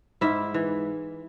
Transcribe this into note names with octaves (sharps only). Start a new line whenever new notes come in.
G#2 E4 E5
E3